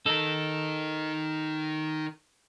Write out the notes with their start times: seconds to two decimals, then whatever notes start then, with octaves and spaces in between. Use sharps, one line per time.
0.06 D#4 A4 A#4